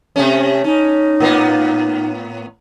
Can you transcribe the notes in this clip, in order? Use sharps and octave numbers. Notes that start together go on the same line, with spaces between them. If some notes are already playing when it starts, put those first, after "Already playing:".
C3 A3 C#4
C#4 D#4
A2 A#3 B3